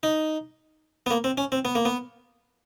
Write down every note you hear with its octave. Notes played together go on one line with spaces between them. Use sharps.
D#4
B3
A#3
C4
C#4
C4
B3
A#3
B3